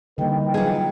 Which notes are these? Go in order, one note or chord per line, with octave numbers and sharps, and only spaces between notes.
D3 E3 G3 A#3 D#4 B4 D#5 G5
F#3 F4 G#4